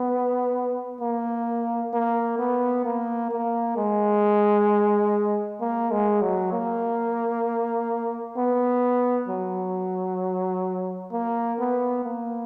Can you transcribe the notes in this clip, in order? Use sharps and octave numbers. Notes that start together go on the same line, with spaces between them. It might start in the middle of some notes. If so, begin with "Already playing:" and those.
Already playing: B3
A#3
A#3
B3
A#3
A#3
G#3
A#3
G#3
F#3
A#3
B3
F#3
A#3
B3
A#3